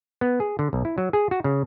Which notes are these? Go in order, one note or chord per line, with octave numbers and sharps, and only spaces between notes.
B3
G#4
D3
B1
E4
F#3
G#4
F#4
C#3